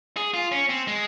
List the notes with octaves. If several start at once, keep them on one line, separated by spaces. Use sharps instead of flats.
G#4
F4
C#4
C4
G#3